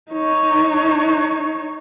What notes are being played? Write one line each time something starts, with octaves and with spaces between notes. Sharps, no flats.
D#4 C#5